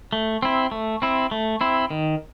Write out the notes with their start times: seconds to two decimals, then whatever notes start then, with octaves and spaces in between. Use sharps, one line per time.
0.13 A3
0.43 C4 E4
0.71 A3
1.02 C4 E4
1.31 A3
1.61 C4 E4
1.91 D#3